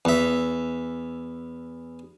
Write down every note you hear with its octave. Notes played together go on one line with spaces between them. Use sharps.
E2 E5